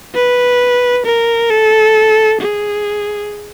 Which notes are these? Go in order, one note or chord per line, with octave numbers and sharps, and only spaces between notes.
B4
A#4
A4
G#4